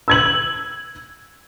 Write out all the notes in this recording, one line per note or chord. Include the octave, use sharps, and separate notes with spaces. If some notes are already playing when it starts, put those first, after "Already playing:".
E6 G#6 F#7